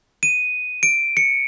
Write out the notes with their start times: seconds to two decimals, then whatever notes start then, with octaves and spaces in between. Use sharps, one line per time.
0.23 D#7
0.83 D7
1.17 C#7